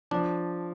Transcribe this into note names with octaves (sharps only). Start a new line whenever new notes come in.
F3 D4